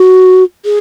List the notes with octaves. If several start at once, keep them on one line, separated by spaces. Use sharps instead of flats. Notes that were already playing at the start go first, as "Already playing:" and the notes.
Already playing: F#4
G#4